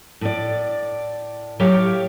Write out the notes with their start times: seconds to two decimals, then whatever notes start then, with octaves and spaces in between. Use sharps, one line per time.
0.21 A2 D5
1.59 A2 F#3 G4 C#5 F5 G5